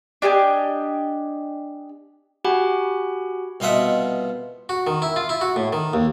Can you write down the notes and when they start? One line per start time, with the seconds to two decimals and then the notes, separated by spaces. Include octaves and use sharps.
0.22 D4 G4 D#5 G#5
2.44 F#4 G4 F#5 G#5 B5
3.60 C2 B2 F4 D#5 E5 F#5
4.69 F#4
4.87 D#3
5.02 E4
5.16 F4
5.29 E4
5.41 F#4
5.56 A2
5.73 D#3
5.93 D#2